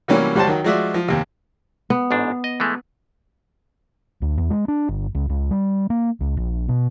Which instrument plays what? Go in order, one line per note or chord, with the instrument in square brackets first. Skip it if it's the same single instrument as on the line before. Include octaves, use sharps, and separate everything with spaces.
[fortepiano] C3 E3 F#3 G3 A#3 C#4
C#2 G3 F#4 C5 A5
D#3 F#3
F3 G#3 F#4 D5 E5
F3
D#2 C3
[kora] B3
[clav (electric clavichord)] A1 G#2 D4
D#5
E3 G#3 A3
[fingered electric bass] D2
E2
G#3
D4
G1
C#2
C#2
G3
A#3
C#2
A#1
B2